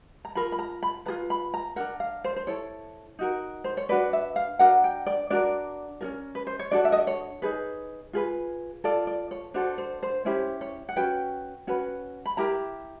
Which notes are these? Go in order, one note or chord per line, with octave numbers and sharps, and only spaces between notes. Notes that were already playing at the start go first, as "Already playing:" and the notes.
A#5
F4 A#4 B5
B5
A#5
B5
F4 G#4 B4 A#5
B5
A#5
D4 F#4 A#4 F#5
F5
C5
C5
E4 A4 C#5
D#4 F#4 A#4
C5
C#5
D4 F#4 B4 D5
E5
F5
D4 F#4 A#4 F#5
G5
D5
D4 F#4 A#4 D5
C#4 F4 A#4
B4
C5
C#5
D4 F#4 A4 D5
E5
D#5
D5
C#5
D#4 G#4 B4
F4 G#4 B4
F4 A4 D5
D5
C#5
D4 F#4 A4 C5
C5
C5
C#4 E4 G4 C5
C#5
F#5
C#4 F#4 B4 G5
C#4 F#4 B4
B5
E4 G4 A#4 A#5